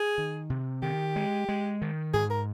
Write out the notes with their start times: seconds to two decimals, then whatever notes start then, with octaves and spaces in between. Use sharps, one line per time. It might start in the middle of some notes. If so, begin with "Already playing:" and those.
Already playing: G#4
0.18 D#3
0.50 C3
0.82 D#3 G4
1.16 G#3
1.48 G#3
1.82 D#3
2.13 G#2 G#4
2.31 A#4